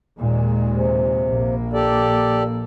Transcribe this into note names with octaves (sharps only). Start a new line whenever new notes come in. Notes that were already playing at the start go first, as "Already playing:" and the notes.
D#2 A#2 G#3
C3
A#1 A#3
G4 A4 D5